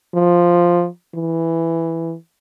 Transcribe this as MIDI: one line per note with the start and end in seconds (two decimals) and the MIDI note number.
0.14 0.87 53
1.15 2.15 52